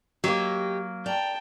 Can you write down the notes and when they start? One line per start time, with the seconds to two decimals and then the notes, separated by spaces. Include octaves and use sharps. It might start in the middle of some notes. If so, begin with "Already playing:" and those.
0.24 F#3 A#3 G4 D#5
1.06 D5 G5 A5 A#5